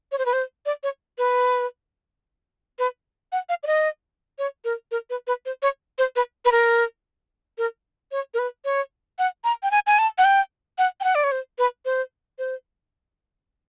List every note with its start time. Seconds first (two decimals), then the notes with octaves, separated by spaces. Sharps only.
0.12 C#5
0.18 C5
0.26 B4
0.33 C5
0.66 D5
0.83 C#5
1.18 B4
2.79 B4
3.32 F#5
3.49 F5
3.63 D5
3.67 D#5
4.39 C#5
4.65 A#4
4.91 A#4
5.10 B4
5.27 B4
5.46 C5
5.62 C#5
5.98 C5
6.16 B4
6.45 B4
6.52 A#4
7.58 A#4
8.12 C#5
8.34 A#4
8.39 B4
8.65 C#5
9.19 F#5
9.44 A#5
9.63 G5
9.71 G#5
9.87 G#5
9.99 A5
10.18 F#5
10.25 G5
10.78 F#5
11.01 G5
11.04 F#5
11.15 D5
11.24 C#5
11.32 C5
11.58 B4
11.85 C5
12.39 C5